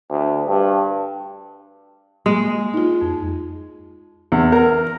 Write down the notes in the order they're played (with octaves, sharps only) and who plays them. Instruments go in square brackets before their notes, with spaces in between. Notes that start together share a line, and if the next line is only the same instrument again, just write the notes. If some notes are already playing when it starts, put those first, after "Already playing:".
[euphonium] D2
G2
[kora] G#3 [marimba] A#3
[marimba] D#4 F4
F2
[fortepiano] E2
A#4